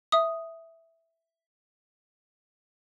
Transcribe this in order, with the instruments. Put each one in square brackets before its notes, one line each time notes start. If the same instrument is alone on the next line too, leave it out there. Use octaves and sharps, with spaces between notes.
[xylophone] E5 D#6